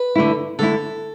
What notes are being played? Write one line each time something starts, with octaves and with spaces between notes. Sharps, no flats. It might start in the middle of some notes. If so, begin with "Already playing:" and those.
Already playing: B4
D3 A3 E4
D3 A3 E4 A4